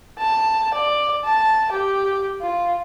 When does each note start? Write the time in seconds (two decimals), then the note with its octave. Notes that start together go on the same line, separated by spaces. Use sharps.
0.18 A5
0.74 D5
1.24 A5
1.72 G4
2.42 F4